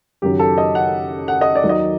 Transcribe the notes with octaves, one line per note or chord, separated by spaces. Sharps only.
F#1 F#2 D#3 F#3 G4
A4
D#5
F#5
F#5
D#5
D5
D#2 D#3 F#3
D#5